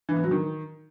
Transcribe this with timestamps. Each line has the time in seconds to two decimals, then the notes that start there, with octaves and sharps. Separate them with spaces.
0.09 E3
0.16 B3
0.24 F#3
0.31 D#3